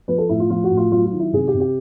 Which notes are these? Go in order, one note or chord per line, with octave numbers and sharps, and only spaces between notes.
F3 B4
A4
A2 E4
F4
F3 F4
F#4
A2
F4
F#3 F4
F4
D#3
E4
C3 G#4
G4
C3
G4